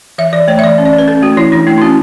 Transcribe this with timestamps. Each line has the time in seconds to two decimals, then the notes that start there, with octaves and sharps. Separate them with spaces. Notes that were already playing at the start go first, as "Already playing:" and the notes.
0.18 E3 E5
0.33 E3 D5
0.48 A3 C#5
0.59 E5
0.63 E3 D5
0.78 C#4
0.85 D5
0.93 C#4
0.98 B4
1.08 C#4 A4
1.22 A3 F#4
1.37 E3 E4
1.52 E3 D4
1.67 A3 E4
1.78 E4
1.81 C#4 F#4